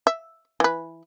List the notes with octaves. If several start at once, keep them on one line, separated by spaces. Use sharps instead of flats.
E5
E3 B4